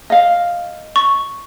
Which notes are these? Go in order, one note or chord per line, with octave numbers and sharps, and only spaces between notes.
D#5 F5
C#6